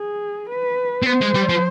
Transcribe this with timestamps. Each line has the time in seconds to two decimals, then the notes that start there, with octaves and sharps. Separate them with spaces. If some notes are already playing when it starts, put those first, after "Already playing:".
Already playing: G#4
0.50 B4
1.03 C4
1.06 B3 C5
1.22 G#3
1.35 G3
1.50 F3